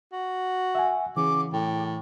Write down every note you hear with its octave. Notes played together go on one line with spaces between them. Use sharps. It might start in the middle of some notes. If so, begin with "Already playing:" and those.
F#4
E5 F#5 G#5
C#3 E3 D6
A2 G5